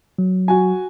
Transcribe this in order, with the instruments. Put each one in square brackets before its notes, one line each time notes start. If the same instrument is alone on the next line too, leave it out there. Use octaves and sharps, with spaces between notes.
[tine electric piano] F#3
[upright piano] F#4 G#5